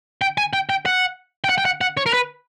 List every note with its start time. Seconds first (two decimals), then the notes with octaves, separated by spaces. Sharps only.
0.21 G5
0.38 G#5
0.53 G5
0.69 G5
0.86 F#5
1.44 G5
1.49 F#5
1.58 G5
1.65 F#5
1.81 F#5
1.97 C#5
2.06 A#4
2.13 B4